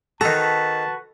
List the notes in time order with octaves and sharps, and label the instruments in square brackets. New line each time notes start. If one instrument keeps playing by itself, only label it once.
[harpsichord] D#3 A#5 [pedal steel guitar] F#4 B4 [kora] A4 [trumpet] A5